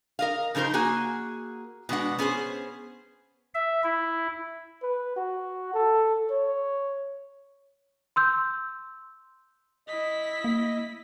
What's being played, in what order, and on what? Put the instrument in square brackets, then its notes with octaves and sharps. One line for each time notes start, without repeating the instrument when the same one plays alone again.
[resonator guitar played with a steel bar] A#4 D#5 F5
C#3 F3 D#4 A#4 C5
A#3 F#4 G#4 G#5
B2 G#3 D4 F#5
B3 C#4 G#4 C5
[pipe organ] E5
E4
[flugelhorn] B4
F#4
A4
C#5
[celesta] C6 E6 G6
[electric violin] E4 B6 [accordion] D#5
[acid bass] A#3